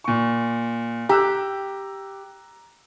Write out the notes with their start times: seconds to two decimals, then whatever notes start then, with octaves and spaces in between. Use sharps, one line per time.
0.04 A#2 C#6
1.09 G4 A#5 E6 F#6